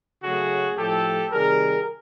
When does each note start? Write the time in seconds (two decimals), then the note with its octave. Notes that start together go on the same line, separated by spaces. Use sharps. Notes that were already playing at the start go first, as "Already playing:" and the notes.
0.23 C#3 F#3 A3 F#4 G#4
0.77 A2 F3 A3 G4 A4
1.31 C3 D#3 G3 G#4 A#4